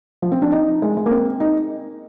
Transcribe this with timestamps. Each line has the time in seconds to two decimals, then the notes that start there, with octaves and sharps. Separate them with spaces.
0.22 F3
0.32 C4
0.42 D4
0.52 D#4
0.82 G#3
0.97 G#3
1.06 A#3
1.11 C4
1.40 D#4